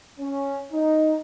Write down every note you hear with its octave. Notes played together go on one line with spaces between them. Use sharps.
C#4
D#4